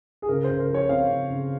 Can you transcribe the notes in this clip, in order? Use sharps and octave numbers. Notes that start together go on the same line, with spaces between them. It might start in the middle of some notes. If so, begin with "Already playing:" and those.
G#4
C#3 A#4
C#3 C5
A#4
F3
C#5
C4 F5
C#3
C#3